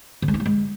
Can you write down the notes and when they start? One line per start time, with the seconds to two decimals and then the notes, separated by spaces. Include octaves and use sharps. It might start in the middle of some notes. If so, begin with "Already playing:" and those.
0.22 D3
0.28 G#3
0.34 D#4
0.40 F#3
0.46 G#3